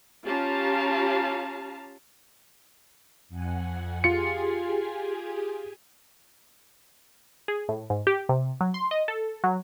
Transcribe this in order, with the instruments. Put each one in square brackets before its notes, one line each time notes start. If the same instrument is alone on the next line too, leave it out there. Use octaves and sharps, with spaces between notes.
[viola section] C#4 F4 G4 F5 A5 A#5
[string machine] F2 F#5 G#5
[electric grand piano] F4 C#7 [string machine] G4 G#4 G#5
[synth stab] G#4
A2
G#2
G4
C3
F#3
C6
D#5
A4
F#3